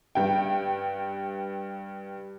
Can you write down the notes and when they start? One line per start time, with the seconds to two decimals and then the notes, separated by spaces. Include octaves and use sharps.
0.15 G2 G5